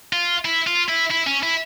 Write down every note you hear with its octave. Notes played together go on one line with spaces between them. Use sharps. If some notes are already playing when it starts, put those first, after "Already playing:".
F4
E4
F4
E4
E4
C#4
E4